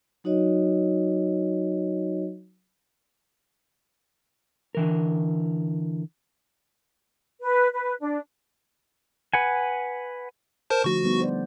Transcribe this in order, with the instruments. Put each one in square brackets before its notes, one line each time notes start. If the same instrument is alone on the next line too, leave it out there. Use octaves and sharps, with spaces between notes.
[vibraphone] F#3 D#4 F#4 C#5 D#5
[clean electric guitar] D3 E3 A#4
[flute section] B4
B4
D4
[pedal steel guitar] B4 F#5 G#5
[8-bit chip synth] A#4 C5 A5
[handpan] D3 F3 A3 [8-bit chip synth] F#4 C#6
[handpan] G3 B3 D#4
C5 D5